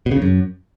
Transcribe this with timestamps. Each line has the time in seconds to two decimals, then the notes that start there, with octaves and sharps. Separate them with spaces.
0.06 B2
0.11 C#3
0.17 E2
0.22 F#2